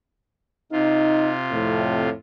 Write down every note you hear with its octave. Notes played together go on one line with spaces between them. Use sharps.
C3 D#4 F4
F2 A2